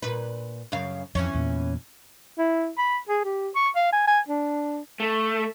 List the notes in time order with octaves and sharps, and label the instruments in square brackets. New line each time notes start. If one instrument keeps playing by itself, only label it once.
[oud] A#2 B4
F#2 C#3 F5
[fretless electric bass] F2 [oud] E3 C#4
[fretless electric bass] E2 A#2
[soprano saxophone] E4
B5
G#4
G4
C#6
F5
G#5
G#5
D4
[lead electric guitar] A3